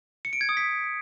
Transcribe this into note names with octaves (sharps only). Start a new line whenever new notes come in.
C#7
D7
G#6
D#6
B6